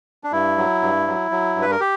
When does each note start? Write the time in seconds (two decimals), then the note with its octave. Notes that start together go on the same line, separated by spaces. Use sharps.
0.24 D4
0.32 G2 E4
0.58 F#3
0.82 G2
1.07 F#3
1.31 F#3
1.56 G2
1.62 B4
1.71 A#4
1.80 G4